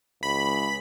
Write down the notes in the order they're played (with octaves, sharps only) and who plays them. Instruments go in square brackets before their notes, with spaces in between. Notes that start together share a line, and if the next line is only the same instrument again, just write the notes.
[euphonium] C#2 [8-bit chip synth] B5